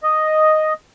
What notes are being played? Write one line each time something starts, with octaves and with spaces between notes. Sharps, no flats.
D#5